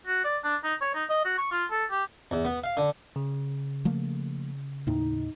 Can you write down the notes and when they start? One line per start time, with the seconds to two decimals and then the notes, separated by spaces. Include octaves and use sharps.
0.06 F#4
0.24 D5
0.44 D4
0.64 D#4
0.81 C#5
0.94 D#4
1.09 D#5
1.25 F#4
1.38 C#6
1.52 F4
1.70 A4
1.91 G4
2.31 E2
2.45 B3
2.64 F5
2.77 D3
3.16 C#3
3.85 F3 A3 A#3
4.87 D#2 A2 D#4